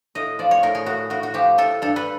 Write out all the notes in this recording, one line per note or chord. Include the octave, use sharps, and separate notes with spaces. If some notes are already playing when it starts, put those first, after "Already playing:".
A2 D#5
F3 D5
C#5
A2 A#4
G#4
A2 F#4
A2 F#4
F#4
F3 G4
A2 A4
G2 A4
B4